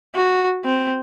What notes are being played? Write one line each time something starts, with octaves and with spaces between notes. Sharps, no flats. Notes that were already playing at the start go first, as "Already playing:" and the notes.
F#4
C4